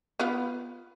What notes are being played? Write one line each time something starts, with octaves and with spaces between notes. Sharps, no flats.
B3 F4 B4